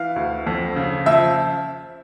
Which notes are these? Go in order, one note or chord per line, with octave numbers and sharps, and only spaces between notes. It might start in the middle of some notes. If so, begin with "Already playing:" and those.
Already playing: E3 F5
D2
F2
C#3
F3 E5